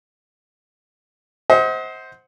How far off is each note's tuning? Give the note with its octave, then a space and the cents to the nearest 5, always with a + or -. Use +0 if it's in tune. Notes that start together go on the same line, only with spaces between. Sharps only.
C5 +0 D#5 +40 F#5 +0